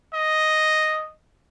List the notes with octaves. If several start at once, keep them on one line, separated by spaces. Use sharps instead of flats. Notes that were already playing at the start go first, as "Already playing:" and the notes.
D#5